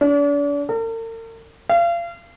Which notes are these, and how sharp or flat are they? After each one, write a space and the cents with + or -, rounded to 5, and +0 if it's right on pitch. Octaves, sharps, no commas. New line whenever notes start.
D4 -40
A#4 -45
F5 -35